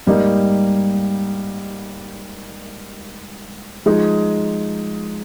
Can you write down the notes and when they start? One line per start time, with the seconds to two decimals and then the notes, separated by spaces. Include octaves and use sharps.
0.07 G#2 G3 A#3 D#4
3.86 F3 G#3 D#4 G#4